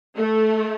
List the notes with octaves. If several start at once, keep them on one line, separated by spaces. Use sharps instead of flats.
A3